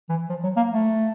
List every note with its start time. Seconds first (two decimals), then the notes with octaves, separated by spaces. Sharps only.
0.09 E3
0.29 F3
0.43 F#3
0.56 A#3
0.71 A3